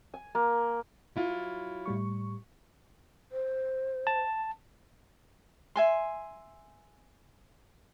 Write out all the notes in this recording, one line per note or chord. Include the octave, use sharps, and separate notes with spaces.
G#5
A#3
F#3 E4 F4
A2 G3 C#6
C5
A5
E5 G#5 C6